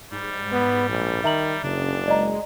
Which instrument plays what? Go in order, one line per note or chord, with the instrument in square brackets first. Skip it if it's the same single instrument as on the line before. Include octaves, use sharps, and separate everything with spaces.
[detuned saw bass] G#2 [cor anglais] G3
[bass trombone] B3
A#1
[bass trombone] D#3 [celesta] E5 A#5 F#7
[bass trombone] F#1 [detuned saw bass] C#3 [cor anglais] D4
[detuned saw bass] G#3 [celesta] D5 D#5 A#5